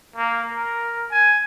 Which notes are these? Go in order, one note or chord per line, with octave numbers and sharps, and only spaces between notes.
A#3
A#4
G#5